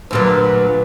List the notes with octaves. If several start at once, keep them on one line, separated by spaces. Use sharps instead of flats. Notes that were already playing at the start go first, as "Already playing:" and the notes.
D2 A#2 F#3 B4